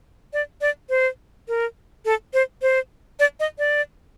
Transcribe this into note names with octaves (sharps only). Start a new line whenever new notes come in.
D5
D5
C5
A#4
A4
C5
C5
D5
D#5
D5